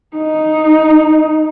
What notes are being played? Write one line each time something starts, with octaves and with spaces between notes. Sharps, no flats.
D#4